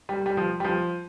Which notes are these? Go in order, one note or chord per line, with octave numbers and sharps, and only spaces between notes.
G3
G3
F3
G3
F3